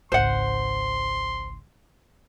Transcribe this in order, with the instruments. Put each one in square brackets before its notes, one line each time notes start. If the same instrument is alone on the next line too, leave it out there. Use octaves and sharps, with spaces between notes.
[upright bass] G#1 C#2 [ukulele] C5 F#5 [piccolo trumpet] C6